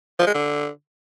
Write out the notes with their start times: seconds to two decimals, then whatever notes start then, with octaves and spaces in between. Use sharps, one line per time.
0.19 F3
0.27 G#3
0.34 D3